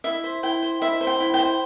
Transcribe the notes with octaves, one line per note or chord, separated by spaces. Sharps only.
E4 E5
C5
E4 G5
C5
E4 E5
C5
G5
E4
G5
C5